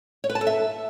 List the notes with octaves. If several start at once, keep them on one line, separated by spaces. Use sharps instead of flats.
C#5
B4
A5
A4
E5